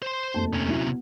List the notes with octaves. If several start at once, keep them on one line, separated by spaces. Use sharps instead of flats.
C5 C6
F1 D#2 A5
C3 C#4
F#3 E4
B3